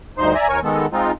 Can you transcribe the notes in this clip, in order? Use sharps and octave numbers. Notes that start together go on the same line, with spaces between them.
D2 G2 D#4 C5 C6
D5 E5 G#5 A#5
D#2 A#4 C#5 G#5 C#6
D#3 G#3 B3 A4
G#3 C4 D#4 F4